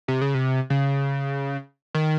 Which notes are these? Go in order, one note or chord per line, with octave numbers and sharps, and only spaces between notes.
C3
C#3
C3
C#3
D#3